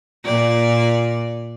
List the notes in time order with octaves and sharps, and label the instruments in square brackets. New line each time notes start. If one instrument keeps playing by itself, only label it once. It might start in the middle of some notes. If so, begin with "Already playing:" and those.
[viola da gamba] A#2 D5